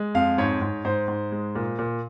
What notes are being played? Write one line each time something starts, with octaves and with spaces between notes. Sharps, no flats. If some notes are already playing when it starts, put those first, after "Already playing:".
Already playing: G#3
F2 F5
G#2 C#5
G#2
G#2 C5
G#2
G#3
A#2
A#2